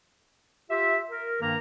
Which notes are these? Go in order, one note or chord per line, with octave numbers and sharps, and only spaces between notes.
F4 G4 E5
A#4
G2 D#3 A#3 A#4 A#5